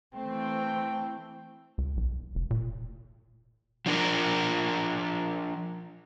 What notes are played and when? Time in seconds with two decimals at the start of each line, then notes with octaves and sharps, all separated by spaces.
0.15 E3 A3 C4 G5
1.78 C#2
1.97 B1
2.35 F1
2.51 A#2
3.86 F3 D4 A#4